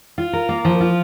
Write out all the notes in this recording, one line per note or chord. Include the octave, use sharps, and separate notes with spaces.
F4
A#4
A#3
F3
F4